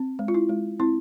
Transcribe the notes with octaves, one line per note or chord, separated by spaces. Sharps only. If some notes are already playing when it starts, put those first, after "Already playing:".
Already playing: C4
G#3
F4
E4
G#3
C4 E4